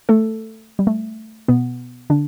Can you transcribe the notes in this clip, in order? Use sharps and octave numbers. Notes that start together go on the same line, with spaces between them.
A3 A4
G3
A3
B2 B3
D3 D4